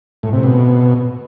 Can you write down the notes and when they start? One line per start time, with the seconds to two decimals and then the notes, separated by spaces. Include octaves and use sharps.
0.23 A2
0.33 C3
0.43 B2